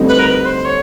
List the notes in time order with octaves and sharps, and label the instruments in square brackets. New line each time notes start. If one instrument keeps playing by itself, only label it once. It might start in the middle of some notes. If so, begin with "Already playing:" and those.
Already playing: [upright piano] D2 D3 G3 C4 D#4
[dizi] B4
A#4
B4
C5
C#5